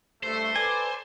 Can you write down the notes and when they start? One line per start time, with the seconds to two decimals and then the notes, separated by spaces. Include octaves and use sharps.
0.23 G2 A3 C5
0.56 A4 B4 D5 G#5